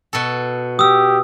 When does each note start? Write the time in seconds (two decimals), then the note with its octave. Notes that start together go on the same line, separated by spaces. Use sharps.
0.13 B2 A4
0.79 G4 D#6 E6